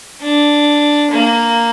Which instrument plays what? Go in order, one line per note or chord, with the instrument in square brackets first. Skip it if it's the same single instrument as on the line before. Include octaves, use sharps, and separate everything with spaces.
[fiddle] D4
A#3